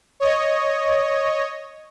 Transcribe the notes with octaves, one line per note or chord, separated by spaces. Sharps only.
C#5 D#5